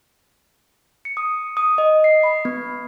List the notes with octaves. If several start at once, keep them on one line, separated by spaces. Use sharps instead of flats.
C#7
D#6
D#6
D#5
C7
B5
B3